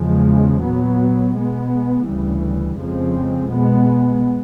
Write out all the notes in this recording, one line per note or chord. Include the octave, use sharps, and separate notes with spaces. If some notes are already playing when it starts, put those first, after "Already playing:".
Already playing: E2 C#3 F3 G#3
A#2 F#3 B3
B2 G#3 B3
D2 C#3 E3 G3
F2 C#3 F3 G#3 C4
B2 G#3 B3